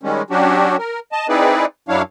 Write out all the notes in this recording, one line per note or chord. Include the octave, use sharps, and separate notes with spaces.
D#3 G3 G#3 C#4
F#3 C#4 D4 F#4 G4
A#4
D#5 A5
C4 D#4 E4 G#4 B4 D5
F#2 F#3 D4 E4 C#5 F5